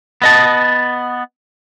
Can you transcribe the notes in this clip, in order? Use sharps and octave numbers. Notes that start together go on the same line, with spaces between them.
B3 D#5 A5